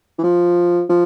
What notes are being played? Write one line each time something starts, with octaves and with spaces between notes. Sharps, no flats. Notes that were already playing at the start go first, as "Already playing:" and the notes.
E3
F3
F3